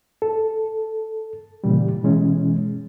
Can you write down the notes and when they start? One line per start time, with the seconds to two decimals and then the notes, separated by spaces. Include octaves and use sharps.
0.22 A4
1.64 A#2 C#3 E3 G3
2.03 B2 E3 G#3 C#4